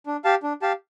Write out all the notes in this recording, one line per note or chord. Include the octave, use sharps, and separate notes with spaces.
D4
G4 F5 A5
D4
G4 F5 A5